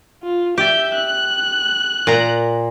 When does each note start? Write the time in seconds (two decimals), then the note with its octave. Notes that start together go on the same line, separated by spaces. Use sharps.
0.23 F4
0.58 G4 D5 E5 G6
0.94 F#6
2.07 A#2 A#5